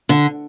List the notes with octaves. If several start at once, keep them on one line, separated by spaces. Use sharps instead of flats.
D3